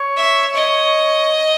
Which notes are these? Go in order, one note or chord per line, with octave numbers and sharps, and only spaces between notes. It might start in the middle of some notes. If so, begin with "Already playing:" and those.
Already playing: C#5
E5
D#5